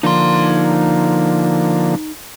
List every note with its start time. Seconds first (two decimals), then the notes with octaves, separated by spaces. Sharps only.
0.03 D3 F3 A#3 D#4 C6